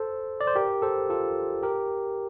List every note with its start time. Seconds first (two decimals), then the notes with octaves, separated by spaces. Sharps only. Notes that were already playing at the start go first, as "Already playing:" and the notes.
Already playing: A4 C5
0.41 D5
0.47 C5
0.56 G4 A#4
0.82 A4 C5
1.10 F4 A4
1.63 G4 A#4